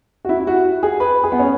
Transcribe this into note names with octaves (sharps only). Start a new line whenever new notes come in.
F#4
E4
E4
F#4
G#4
B4
G#4
B3
C#4